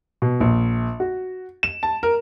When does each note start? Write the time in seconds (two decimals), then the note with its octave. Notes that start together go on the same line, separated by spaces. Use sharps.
0.22 B2
0.40 A#1
1.00 F#4
1.63 E7
1.83 A5
2.03 A#4